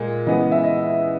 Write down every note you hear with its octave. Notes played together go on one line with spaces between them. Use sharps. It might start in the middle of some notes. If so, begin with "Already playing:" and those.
Already playing: A#2 G#3
C#3 E3 G#3 B3 D#5
E5
D#5